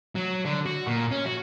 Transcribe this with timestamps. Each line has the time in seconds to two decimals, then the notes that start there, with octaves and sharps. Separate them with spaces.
0.15 F#3
0.45 D3
0.66 F#4
0.87 A#2
1.11 C#4
1.26 F#4